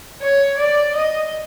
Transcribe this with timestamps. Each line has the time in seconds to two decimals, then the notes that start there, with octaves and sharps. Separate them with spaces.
0.21 C#5
0.58 D5
0.96 D#5